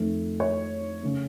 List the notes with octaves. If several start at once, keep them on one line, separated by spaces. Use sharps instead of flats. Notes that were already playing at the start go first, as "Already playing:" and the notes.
Already playing: F2 D#3 A3
C#5
C#3 A3